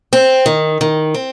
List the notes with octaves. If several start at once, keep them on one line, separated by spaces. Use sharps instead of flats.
C4
D#3
D#3
C4